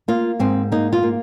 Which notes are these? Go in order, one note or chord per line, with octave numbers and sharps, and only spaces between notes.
A#3 F4
G#2 C4
A#3 D#4
F4
A#3